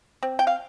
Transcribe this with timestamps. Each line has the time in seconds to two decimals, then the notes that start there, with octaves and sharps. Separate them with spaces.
0.23 C4
0.39 G5
0.47 F5